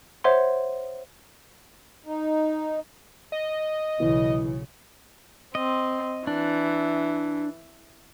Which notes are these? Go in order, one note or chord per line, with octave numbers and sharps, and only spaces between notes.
C5 C#5 E5 F#5 C6
D#4
D#5
B1 C#3 E3
C4 D#5
E3 D4